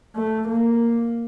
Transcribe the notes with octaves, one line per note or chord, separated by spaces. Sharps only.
A3
A#3